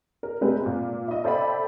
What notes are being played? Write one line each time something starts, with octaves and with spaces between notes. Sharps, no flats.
A#4
C3 G#3 A3 C4 B4
A#2
D#5 E5
A4 C5 D5 E5 G5 B5